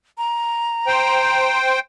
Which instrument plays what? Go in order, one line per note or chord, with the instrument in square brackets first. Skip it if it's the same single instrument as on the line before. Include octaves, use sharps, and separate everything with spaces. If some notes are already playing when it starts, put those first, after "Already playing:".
[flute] A#5
[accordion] C5 G5